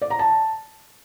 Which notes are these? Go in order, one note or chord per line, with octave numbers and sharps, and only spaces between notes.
D5
A#5
A5